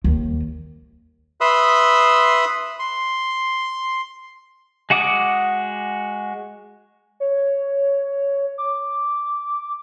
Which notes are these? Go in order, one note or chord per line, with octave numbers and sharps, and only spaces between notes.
D#2
B4 E5 B5 C6 D#6 E6
C6
G#3 F#4 F#5 D6 D#6
C#5
D6